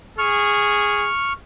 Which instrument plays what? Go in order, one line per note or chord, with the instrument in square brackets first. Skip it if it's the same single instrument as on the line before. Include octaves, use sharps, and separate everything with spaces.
[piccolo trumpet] G#4 [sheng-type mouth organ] C#6 F6